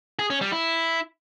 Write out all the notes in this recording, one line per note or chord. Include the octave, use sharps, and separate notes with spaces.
G#4
C#4
G3
E4